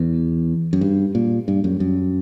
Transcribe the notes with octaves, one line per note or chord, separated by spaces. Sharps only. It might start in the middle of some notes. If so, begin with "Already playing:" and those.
Already playing: E2
F#2
G2
A#2
G2
F#2
F#2